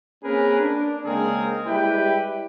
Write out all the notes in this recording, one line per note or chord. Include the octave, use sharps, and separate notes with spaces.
A#3 C4 C#4 G#4 A#4 B4
D4
C#3 G#3 A#3 C4 G#4 A#4
G3 G#3 E4 G4 B4 G5